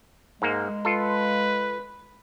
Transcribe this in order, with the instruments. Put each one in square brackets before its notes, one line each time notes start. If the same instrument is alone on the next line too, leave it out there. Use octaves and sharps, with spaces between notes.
[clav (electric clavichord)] G#2 A#3 [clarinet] G#3
[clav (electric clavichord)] F4 A4 [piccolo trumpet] B4